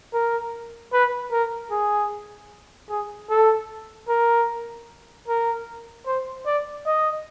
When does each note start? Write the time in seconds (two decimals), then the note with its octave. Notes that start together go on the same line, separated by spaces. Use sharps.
0.13 A#4
0.93 B4
1.32 A#4
1.71 G#4
2.89 G#4
3.30 A4
4.08 A#4
5.28 A#4
6.06 C5
6.46 D5
6.86 D#5